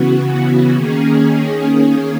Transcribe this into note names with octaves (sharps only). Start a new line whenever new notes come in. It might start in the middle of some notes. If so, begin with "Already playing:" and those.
Already playing: C#3 E3 B3 F#4
D#3 A#3 C#4 G#4